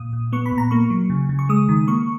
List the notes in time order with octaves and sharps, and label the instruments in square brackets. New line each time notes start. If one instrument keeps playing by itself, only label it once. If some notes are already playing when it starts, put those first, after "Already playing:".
Already playing: [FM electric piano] A#2 D#6
A#2
B3 C#6
B5
A#2
A#5
A#3 C#6
F#3
C#3
C#3
C#6
G#3 D#6
D#3
A#3 C#6